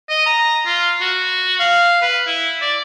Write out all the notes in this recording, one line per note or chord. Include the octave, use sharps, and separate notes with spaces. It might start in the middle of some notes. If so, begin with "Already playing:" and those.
D#5
A#5
F4
F#4
F5
B4
E4
D5